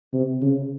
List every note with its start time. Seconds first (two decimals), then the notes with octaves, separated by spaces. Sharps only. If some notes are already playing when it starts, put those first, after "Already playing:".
0.13 C3
0.42 C#3